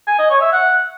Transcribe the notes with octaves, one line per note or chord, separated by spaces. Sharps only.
G#5
D#5
C#5
E5
F#5